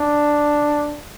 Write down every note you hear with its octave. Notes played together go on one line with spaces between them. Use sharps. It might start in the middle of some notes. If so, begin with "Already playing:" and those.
Already playing: D4